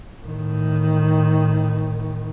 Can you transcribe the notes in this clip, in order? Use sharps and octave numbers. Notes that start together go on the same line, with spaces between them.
A2 D#3